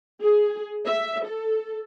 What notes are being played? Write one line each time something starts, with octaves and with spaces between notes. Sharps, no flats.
G#4
E5
A4